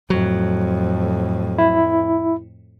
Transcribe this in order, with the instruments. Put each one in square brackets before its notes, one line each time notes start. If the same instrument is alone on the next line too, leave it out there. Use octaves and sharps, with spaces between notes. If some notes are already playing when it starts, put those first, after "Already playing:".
[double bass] F2 A2 [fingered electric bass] F#3
[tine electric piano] E4